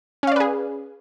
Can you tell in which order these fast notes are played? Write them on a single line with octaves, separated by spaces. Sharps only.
C#4 F5 D5 B4 G#4